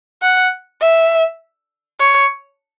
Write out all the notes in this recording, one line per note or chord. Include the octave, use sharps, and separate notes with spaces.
F#5
E5
C#5